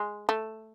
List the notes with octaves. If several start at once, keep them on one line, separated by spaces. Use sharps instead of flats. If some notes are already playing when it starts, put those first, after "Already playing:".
Already playing: G#3
A3